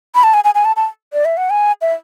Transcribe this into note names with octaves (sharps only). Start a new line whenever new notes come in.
B5
A5
G#5
G#5
G#5
A5
A5
D5
E5
F#5
G#5
E5